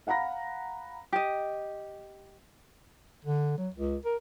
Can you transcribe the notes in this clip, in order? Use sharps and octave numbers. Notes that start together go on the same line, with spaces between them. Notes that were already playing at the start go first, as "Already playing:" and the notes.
F5 F#5 A#5 B5 A#6
G4 D#5
D3
F#3
C#2
A#4